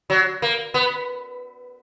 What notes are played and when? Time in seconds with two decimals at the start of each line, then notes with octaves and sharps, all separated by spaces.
0.10 F#3
0.42 A#3
0.74 B3